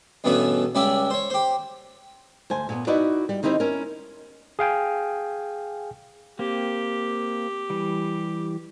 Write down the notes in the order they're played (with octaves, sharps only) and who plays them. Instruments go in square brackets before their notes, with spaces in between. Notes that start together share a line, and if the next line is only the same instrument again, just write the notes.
[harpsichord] E2 G2 B2 A3 B3 C#4
C#2 G3 C#4 D5 E5
C5 C#5
G4 C5
[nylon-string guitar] D2 C5 G#5
A#2 B3
D#4 E4 F#4 B4 D5
G3
D#3 C4 D#4 E4 G4 C5
C#4 E4 A#4
[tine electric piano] G#4 F5 G5 G#5
[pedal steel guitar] A#3 C4 [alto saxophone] G4
[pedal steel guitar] E3 G3